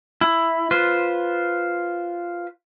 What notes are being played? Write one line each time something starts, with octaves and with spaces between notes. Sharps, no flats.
E4
F4 B4 C5